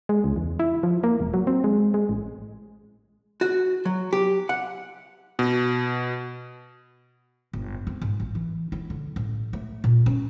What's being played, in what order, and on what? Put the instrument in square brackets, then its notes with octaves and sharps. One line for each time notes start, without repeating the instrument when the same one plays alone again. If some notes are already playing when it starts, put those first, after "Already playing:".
[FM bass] G#3
C#2
E2
E4
F3
A#3
E1
F#3
C4
G#3
G#3
A1
[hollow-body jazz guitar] F#4
F#3
G4
F#5
[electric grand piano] B2
[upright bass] G1
C4
G#1
A1
E3
E4
D3
A1
A3
A#2
C#4